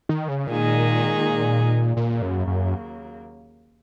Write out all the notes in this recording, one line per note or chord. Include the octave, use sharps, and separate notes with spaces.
D#3
C#3
A#2 D#3 G#3 D#4 G#4
D#2 A#2 C#3 F#3 A#3
F#2
F#2